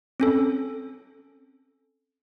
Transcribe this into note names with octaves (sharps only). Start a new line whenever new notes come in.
C4 C#4 A4